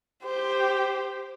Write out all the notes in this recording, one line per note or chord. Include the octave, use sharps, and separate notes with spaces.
G4 C5